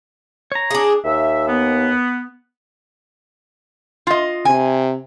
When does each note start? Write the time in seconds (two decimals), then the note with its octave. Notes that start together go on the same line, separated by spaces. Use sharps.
0.52 C#5 A#5
0.71 D4 G#4
1.04 D#2 E5
1.48 B3
4.07 F4 D#5
4.45 C3 G#5